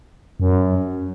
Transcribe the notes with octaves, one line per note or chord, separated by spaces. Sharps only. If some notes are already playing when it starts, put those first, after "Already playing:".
F#2